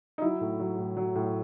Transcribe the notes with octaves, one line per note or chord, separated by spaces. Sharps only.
D#4
F#3 E4
A2
F#3
A2
F#3
A2